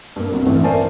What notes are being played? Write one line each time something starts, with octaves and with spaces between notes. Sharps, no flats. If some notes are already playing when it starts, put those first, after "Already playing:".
G2 A#3
G1 C2 C3
A1 G2 E3 A3
A#4 C5 D5 E5 G#5 A5